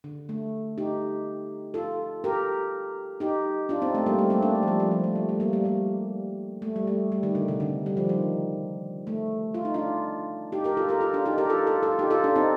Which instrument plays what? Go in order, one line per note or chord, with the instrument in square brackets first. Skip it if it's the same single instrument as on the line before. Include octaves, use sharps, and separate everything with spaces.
[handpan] D3
A3
D#4 G4
F4 A4
G4 A#4
D#4 G4
D4 F4
C4 D#4
A3 C4
G3 A#3
A3
A3 C4
A#3 D4
A3
F3
G3
F3
F3
A3
G3
A3
G3 A#3
G3 A#3
G3 A#3
A3
G3
A3
G3
D#3
D3
C3
D3
G3
F3
D#3
A3
F4
D#4
D4 F4
D#4 G4
G4 A#4
F4 A4
G4 A#4
F4 A4
D4 F4
D#4 G4
G4 A#4
F4 A4
F4 A4
F4 A4
D#4 G4
F4 A4
D4 F4
C4 D#4